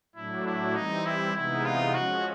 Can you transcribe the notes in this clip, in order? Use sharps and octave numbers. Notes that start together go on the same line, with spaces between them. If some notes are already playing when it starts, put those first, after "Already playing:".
A2 F#3 A3 D4 E4
E4
E3 G3 C4 D#4
E4
C3 E3 G#3 B3 D#4 E4
F4
F3 G#3 C#4 F#4